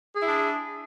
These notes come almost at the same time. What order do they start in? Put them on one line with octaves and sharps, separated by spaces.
G#4 E4 D4